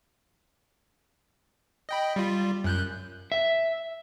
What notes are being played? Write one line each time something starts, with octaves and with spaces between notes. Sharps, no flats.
D#5 G5 B5
G3 F4
F#2 F#6 G6
E5